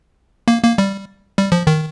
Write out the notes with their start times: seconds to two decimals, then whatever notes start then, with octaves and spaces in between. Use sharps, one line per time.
0.48 A#3
0.63 A#3
0.78 G3
1.38 G3
1.52 F3
1.67 D#3